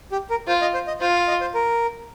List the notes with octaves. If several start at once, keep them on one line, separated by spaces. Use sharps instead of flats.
G4
A#4
F4 C5
D#5
C5
D#5
F4 C5
F5
D#5
C5
A#4